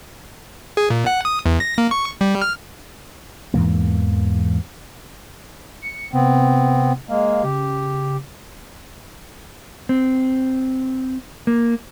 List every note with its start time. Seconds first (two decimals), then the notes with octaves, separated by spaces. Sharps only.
0.77 G#4
0.90 A#2
1.06 F#5
1.25 D#6
1.46 E2
1.60 A#6
1.78 A#3
1.91 C#6
2.21 G3
2.42 F6
3.54 E2 G#2 E3 A#3
5.82 C#7
6.13 C3 B3 C4
7.09 G#3 A#3 F5
7.43 C#3 G4
9.89 C4
11.47 A#3